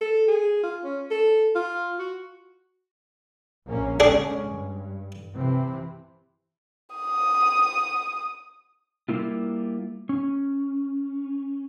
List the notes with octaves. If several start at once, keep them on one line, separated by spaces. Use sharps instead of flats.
A4
G#4
F4
C#4
A4
F4
F#4
A#1 A#3 C#4
D3 G#3 C#4 D4 G#4
G2
C3 E3 C4
D#6
G3 A#3 E4 F4
C#4